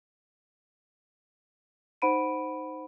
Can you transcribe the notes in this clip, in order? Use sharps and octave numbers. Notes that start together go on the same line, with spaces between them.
D#4 C5 F#5 B5 D7 D#7